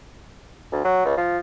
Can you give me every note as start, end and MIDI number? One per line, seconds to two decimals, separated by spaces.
0.72 0.82 38
0.85 1.04 54
1.05 1.16 37
1.17 1.38 53